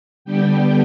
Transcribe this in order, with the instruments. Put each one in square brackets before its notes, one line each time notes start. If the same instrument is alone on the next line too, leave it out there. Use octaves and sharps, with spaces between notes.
[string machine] D3 G3 B3 D4 G5